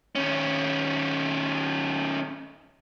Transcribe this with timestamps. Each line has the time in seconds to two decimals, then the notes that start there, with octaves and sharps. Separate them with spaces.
0.15 D#3 C#4